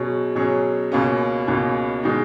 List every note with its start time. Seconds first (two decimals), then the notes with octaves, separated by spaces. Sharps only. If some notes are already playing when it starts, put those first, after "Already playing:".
Already playing: B2 F#3 C#4 G#4 C#5
0.35 B2 F#3 C#4 G#4 C#5
0.92 C#2 B2 A#3 C#4
1.47 C#2 B2 A#3 C#4
2.03 B2 G#3 D#4